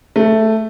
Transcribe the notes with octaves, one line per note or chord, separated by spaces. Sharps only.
A3